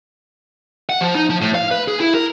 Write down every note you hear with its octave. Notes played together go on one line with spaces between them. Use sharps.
F#5
F3
D#4
F3
A2
F5
B4
G#4
E4
A#4